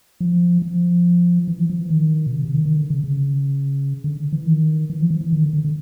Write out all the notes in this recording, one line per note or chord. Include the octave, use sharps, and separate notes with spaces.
F3
F3
E3
F3
F3
E3
D#3
B2
C3
C3
D#3
D#3
D3
C#3
C#3
D3
E3
D#3
E3
F3
E3
E3
D#3
D3
D3
D3